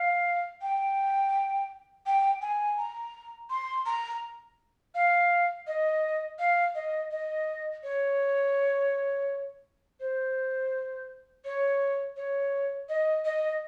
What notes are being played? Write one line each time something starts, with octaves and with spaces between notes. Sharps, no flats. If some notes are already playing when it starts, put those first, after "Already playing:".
Already playing: F5
G5
G5
G#5
A#5
C6
A#5
F5
D#5
F5
D#5
D#5
C#5
C5
C#5
C#5
D#5
D#5